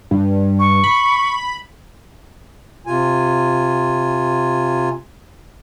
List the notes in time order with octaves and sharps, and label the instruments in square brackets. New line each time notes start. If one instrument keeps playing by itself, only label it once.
[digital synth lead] G2
[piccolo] C#6
[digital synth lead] B5
[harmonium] C3 F4 G#5